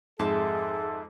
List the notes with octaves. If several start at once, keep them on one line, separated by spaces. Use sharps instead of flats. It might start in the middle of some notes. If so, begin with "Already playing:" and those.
F2 G#2 G#3 G#4 A4 E5 A5